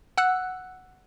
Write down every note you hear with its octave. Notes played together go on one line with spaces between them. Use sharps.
F#5 E6 F#6